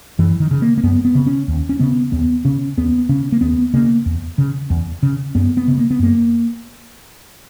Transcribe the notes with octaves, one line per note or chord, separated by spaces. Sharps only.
F#2 E3
D#3
C#3
A#3
A#3
F#2 B3
B3
C#3
C#4
D#2
C#4
C#3 B3
D#2 B3
C#3 C#4
D#2 B3
C#3 C#4
A#3
D#2 B3
C#3 A#3
E2
C#3
E2
C#3
F#2 B3
B3
C#3
A#3
B3
F#2 A#3